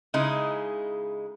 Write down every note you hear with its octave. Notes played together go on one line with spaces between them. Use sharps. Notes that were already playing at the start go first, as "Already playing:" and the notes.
C#3 G#3 D#4 E4